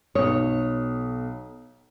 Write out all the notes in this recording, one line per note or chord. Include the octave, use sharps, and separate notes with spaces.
B1 C#5 D#6